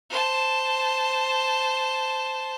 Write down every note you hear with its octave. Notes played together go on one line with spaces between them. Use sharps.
C5 A5